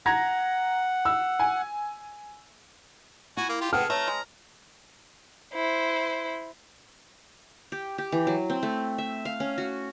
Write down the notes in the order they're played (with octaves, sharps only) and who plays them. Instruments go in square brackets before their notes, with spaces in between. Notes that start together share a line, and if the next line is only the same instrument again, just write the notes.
[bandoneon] F#5 [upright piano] A#5 G#6 A#6
[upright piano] E6
G#5
[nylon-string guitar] E4 [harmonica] F#4 G#5
[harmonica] A#3
F4 G4
[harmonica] G#3 A4 [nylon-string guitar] B4 F#5 G5 [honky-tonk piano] F6
[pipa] A3 [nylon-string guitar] C#5 [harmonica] A#5
[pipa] G#3
[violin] E4 C5
[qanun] G4
G4
E3
F#3
C4
A3
E5
F5
C#4
F#4